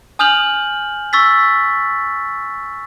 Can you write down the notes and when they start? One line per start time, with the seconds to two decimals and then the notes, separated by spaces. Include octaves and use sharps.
0.19 G#5 D#6 F6 G6 F7 F#7
1.13 C#6 E6 A6 B6